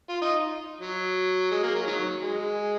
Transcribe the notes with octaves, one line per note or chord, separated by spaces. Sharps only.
F4
D#4
F#3
G#3
A#3
F#3
D#3 F#3
G#3